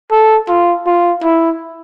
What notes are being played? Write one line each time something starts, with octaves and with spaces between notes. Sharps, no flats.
A4
F4
F4
E4